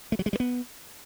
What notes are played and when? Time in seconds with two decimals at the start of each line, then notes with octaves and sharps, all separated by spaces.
0.12 A3
0.19 F#3
0.26 G#3
0.33 G3
0.40 B3